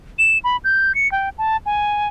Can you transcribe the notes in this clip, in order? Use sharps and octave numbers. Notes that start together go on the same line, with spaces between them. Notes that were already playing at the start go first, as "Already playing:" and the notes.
E7
B5
G6
C#7
G5
A5
G#5